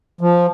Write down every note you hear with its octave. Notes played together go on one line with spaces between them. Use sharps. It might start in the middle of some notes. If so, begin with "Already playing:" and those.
F3